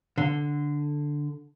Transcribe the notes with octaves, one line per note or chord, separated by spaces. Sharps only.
D3